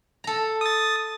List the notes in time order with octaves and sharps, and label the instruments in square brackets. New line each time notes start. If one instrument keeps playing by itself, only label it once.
[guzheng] A4 A#5
[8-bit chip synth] D#6 A6